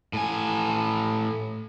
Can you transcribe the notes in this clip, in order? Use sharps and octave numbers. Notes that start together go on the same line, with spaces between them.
A2 G#5